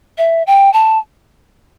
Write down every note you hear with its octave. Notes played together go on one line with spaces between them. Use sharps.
E5
G5
A5